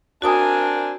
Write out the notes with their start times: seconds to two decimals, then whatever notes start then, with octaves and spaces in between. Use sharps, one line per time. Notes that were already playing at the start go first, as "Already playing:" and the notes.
0.22 C4 D4 F#4 A#4 G#5 A5 D#6